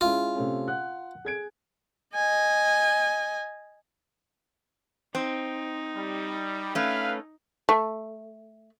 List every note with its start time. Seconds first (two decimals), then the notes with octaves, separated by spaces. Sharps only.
0.01 G#3 C#4 E4 F4
0.35 C3 A3 C#4
0.68 F#5 F#6
1.25 G#4 G#6 D7
2.15 D#5 G#5
5.15 C4 D#4
5.95 G3
6.75 A3 C#4 B4 F5
7.69 A3